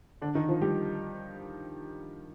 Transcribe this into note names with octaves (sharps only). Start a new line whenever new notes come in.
D3 D4
D#3 D#4
F3 F4
G3 G4